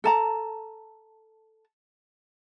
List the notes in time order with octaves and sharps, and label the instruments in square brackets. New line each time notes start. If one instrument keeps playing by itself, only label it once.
[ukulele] A4 A5 A#5